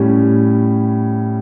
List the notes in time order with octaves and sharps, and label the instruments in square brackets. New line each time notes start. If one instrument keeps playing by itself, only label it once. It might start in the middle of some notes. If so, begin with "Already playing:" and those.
Already playing: [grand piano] A2 G3 C#4